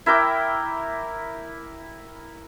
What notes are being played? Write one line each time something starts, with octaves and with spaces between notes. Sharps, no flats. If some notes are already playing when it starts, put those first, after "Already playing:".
E4 A#4 G5 D6